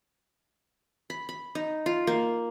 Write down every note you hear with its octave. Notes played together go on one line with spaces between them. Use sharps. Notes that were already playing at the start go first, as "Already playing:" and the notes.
B5
B5
D#4
F4
A#3